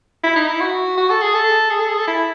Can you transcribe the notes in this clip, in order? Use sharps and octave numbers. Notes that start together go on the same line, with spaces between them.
E4
D#4
E4
F#4
F#4
A4
G#4
A4
G#4
A4
G#4
A4
E4